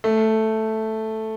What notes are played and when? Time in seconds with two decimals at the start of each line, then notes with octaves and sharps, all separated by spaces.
0.04 A3